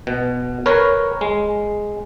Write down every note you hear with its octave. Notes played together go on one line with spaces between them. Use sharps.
B2
A#4 B4 C#5
G#3